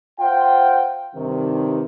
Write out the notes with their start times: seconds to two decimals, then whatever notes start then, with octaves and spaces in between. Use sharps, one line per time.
0.20 F4 C5 F#5 G5
1.15 G2 C3 D#3